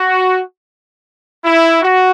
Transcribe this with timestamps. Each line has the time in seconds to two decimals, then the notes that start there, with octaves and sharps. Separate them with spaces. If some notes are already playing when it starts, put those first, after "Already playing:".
Already playing: F#4
1.45 E4
1.82 F#4